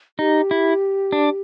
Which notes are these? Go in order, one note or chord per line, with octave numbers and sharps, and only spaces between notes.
D#4 G4
E4
D4